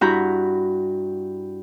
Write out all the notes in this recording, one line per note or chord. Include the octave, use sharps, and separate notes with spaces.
G2 E4 F#4 A#5 B5 G6